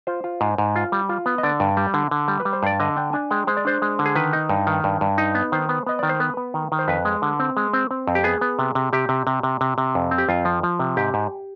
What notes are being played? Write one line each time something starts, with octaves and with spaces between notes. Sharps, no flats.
F4 C5
F4
G#2
G#2
F4
G3
F4
B3
D#5
D3 D5
G2
G3
D3
D3
G3
B4
G3
C5
G2 D5
D3 D#5
D4 G5
D4 G#5
G#3 G5
G#3 C5
D5
D4 C5
G#3
D3
G#4
D#3 B4
D#4
G2
D#3
G2
G2
D#4
B3
D#3 C5
B3
B3 D#5
D#3 D5
C5
B3 B4
B3
D#3
D#3
C5
F2 B4
G#3
D3
C4
G#3
C4
C4
F2
G4
B3 G#4
B3
C3
C3
C3 G4
C3
C3
C3
C3
C3
F2
C4
G4
F2 F4
F3
F3
C3
G#2 G4
G#2